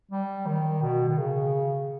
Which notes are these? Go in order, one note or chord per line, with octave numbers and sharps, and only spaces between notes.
G3
D#3
B2
D#3
C#3